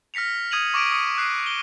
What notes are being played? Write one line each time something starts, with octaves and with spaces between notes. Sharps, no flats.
F6 A#6 B6 C#7 F7
D#6 G#6 D#7 F7 F#7
C#6 D6 A#6 D7 D#7
D#6 C#7
D6 D#6 F#6 C7
G7